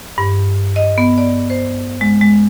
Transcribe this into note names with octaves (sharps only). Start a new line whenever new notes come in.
G2
D#5
B3
D5
C5
G#3
G#3